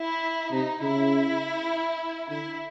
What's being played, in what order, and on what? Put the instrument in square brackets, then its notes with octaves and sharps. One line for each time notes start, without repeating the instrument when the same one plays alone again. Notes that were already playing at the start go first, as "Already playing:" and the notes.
Already playing: [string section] E4
[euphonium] C3 [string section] D#4
[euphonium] C#3 [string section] E4
[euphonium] D3 [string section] E4